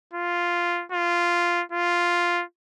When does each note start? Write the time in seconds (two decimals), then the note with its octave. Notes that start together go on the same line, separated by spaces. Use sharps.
0.14 F4
0.92 F4
1.72 F4